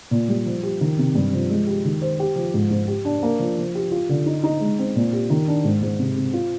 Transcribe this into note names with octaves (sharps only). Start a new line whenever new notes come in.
A#2
G3
F3
G4
D#3
C3
G2
F3
G#3
G4
D#3
C5
G4
F3
G#2
G#2
G4
D4
A#3
F3
F3
G4
F4
D3
D#4
D#4
G#3
C4
A#2
G4
D#3
D4
G#2
G#2
C3
C3
F4